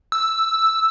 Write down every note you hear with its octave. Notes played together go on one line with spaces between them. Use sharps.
E6